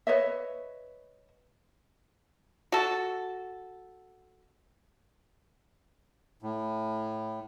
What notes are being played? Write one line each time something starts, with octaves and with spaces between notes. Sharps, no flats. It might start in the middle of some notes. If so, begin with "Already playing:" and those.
B4 C#5 D#5 E5
F#4 A4
A2